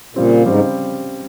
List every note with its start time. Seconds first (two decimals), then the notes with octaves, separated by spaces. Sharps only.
0.15 A#2 C#3 G3 C4
0.46 G#2 C#3 G3 C4